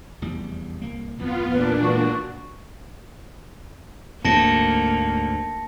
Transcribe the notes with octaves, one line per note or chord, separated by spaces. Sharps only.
F1 E2 G3
C2 A#3
D1 F2 A2 B3 F4
E2 G2 A#2 D4 B4
E3 G#3 F#4
D2 G#2 A#3 A5 A#6 C#7